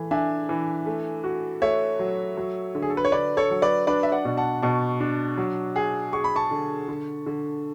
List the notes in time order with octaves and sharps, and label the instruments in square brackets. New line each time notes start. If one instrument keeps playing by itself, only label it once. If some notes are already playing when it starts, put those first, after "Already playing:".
Already playing: [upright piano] E3 A3
[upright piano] D4 [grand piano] E5 G#5
[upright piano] E3
A3
F#4
[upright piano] A3 [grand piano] C#5 E5
[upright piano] F#3
F#3
D3
[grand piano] G#4
A4
B4
C#5
[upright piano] D3 [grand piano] B4 D5
[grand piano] A4 C#5
[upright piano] F#3
[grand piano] B4 D5
[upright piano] D4 [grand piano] B4 D5
[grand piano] E5
D5 F#5
[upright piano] B2
[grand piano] F#5 A5
[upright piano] B2 [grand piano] A5 C#6
[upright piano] D4
F#3
G#4
[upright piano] G#4 [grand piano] C#6
[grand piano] B5
A5 C#6
[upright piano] D3
D3
D3